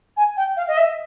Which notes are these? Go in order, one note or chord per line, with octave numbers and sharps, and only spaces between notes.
G#5
G5
F5
D#5
E5